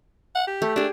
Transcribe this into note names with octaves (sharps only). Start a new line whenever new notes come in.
F#5
G4
A3
D4 G4 G#4